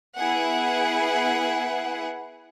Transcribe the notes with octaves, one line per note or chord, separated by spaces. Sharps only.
B3 E4 G#4 F#5